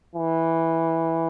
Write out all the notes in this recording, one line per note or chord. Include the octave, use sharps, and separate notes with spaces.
E3